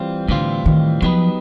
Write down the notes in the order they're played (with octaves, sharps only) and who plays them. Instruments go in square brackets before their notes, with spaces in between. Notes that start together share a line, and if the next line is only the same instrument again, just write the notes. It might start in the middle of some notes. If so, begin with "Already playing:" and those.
Already playing: [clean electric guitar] E3 G3 C4 F4
[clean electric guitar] A2 E3 G3 C4 F4 [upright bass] D3
[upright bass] D#3
[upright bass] F3 [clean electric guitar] F#3 B3 D#4 G4 B4